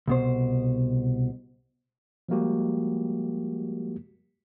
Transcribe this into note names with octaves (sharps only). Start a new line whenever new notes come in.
C2 B2 C5
F3 G3 G#3 A#3 F#4 G4